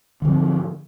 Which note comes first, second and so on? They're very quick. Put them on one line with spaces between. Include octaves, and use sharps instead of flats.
D3 F3 C4 G#2